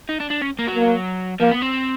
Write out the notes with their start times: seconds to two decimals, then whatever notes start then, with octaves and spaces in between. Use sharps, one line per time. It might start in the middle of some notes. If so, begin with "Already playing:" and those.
0.09 D#4
0.20 D4
0.31 D4
0.42 C#4
0.59 A#3
0.67 F#3
0.75 A#3
1.40 F3 A#3
1.51 B3
1.62 C4